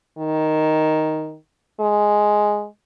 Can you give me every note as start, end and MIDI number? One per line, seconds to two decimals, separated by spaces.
0.18 1.36 51
1.80 2.66 56